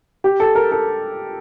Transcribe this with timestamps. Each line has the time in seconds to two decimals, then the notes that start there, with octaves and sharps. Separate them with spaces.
0.24 G4
0.40 A4
0.55 A#4
0.72 A4